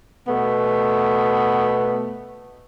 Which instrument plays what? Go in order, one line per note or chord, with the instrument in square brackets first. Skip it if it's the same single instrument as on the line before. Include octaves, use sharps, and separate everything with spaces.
[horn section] B2 A3 B3